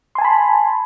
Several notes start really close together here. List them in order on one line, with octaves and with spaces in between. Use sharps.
C6 G#5 A5 B5